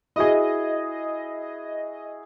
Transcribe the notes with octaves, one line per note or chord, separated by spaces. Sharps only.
E4 F#4 G#4 D#5